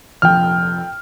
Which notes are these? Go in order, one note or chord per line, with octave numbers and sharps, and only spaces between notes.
F1 A#1 F2 G5 F6